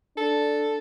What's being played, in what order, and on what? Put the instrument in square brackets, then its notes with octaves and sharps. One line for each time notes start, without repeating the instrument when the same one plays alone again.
[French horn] D4 [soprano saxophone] A4